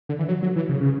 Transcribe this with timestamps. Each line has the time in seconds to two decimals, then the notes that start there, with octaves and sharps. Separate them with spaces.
0.09 D3
0.19 E3
0.28 F#3
0.42 F#3
0.56 E3
0.69 C#3
0.81 C#3